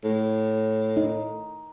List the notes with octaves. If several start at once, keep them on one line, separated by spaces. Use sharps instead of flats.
A2
D#4